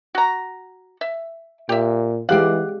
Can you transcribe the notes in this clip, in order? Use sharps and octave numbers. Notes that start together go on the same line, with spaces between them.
F#4 A#5
E5
A#2 G4 E5
E3 G#3 G4 D5 F5 F#5